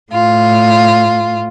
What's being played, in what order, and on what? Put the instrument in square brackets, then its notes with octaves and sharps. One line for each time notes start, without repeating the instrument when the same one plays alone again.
[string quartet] A2 F4